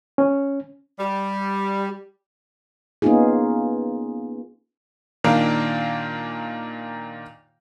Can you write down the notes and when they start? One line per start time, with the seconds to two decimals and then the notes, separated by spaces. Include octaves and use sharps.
0.18 C#4
0.98 G3
3.02 A#3 B3 C#4 D#4 F4 G#4
5.24 A#2 D#3 A#3 D4